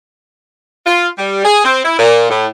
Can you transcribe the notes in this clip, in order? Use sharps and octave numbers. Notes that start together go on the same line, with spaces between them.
F4
G3
G#4
C4
E4
A#2
A2